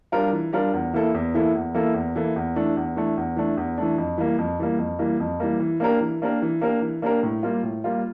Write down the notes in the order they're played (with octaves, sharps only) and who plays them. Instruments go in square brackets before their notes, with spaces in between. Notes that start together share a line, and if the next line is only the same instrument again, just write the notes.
[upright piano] G3 D4 F4 A#4
E3
G3 D4 F4 A#4
E2
E3 A#3 E4 A4
E2
E3 A#3 E4 A4
E2
E3 A#3 E4 A4
E2
E3 A#3 E4 A4
E2
E3 A3 D4
E2
E3 A3 D4
E2
E3 A3 D4
E2
E3 A3 D4
F2
E3 G3 A#3
F2
E3 G3 A#3
F2
E3 G3 A#3
F2
E3 G3 A#3
E3
A#3 D4 G4 A#4
E3
A#3 D4 G4 A#4
E3
A#3 D4 G4 A#4
E3
A#3 D4 G4 A#4
A2
G3 A#3 F4
A2
G3 A#3 F4